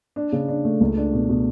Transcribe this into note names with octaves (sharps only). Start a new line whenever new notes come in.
D4
C#3
D4
A3
C#2
D4
B2
B2